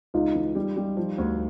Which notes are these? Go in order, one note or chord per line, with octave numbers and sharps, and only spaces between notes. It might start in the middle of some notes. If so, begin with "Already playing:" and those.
C#2 D#4 F4
E3
G3
G3
F3
D2